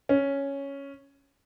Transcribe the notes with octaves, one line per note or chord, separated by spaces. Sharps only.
C#4